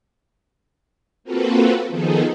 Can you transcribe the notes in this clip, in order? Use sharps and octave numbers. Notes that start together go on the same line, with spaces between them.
A#3 C4 F4 F#4 A4 B4
D#3 F3 B3 D#4 G#4 A4